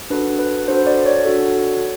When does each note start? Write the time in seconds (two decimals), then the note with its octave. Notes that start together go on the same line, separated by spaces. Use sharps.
0.10 D4 F#4 A4 B4
0.39 B4
0.68 D4 F#4 A4 C5
0.87 D5
1.06 C#5
1.25 D4 F#4 A4